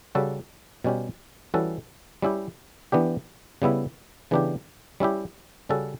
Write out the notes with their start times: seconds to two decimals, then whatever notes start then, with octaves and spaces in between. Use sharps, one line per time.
0.15 C#3 G3 C#4 F#4 A4
0.84 B2 G3 C#4 G4
1.54 E3 G3 C#4 F#4 A4
2.22 G3 C#4 E4 G4
2.92 E3 B3 D4 G4
3.62 C#3 G3 B3 E4
4.31 C#3 E3 B3 D4 G4
5.00 G3 C#4 E4 G4
5.69 C#3 G3 C#4 F#4 A4